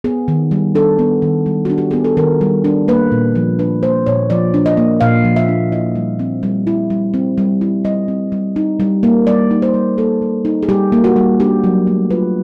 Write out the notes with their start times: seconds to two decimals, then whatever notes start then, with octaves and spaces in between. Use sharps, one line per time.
0.04 B3 G#4
0.28 D#3
0.51 G3
0.75 D4 A4
0.99 B3
1.22 D#3
1.46 G3
1.65 D4 F#4
1.78 G4
1.91 B3 G#4
2.04 A4
2.17 D#3 A#4
2.41 G3
2.64 D4
2.88 A#3 B4
3.12 A#2
3.35 F3
3.59 D4 B4
3.83 A#3 C5
4.06 A#2 C#5
4.30 F3 D5
4.54 D4
4.66 D#5
4.77 A#3
5.01 A#2 F5
5.25 F3
5.36 E5
5.48 D4
5.72 E4 D#5
5.95 G3
6.19 C4
6.43 G3
6.67 E4
6.90 G3
7.14 C4
7.38 G3
7.61 E4
7.84 G3 D#5
8.08 C4
8.32 G3
8.56 D#4
8.80 G3
9.03 A#3
9.27 G3 D5
9.51 D#4
9.62 C5
9.74 G3
9.98 A#3 A4
10.22 G3
10.45 D#4
10.63 G#4
10.69 G3 G4
10.92 A#3
11.04 F#4
11.16 G3
11.40 D4 G4
11.64 F#3
11.87 A3
12.11 F4 B4